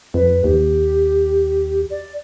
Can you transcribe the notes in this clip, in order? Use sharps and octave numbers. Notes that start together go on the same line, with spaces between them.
F2 B4
D#2 G4
D5